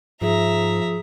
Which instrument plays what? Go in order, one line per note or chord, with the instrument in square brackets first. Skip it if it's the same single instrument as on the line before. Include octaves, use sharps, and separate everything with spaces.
[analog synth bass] G#2 [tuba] F3 [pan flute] G#4 [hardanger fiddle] E5 A#5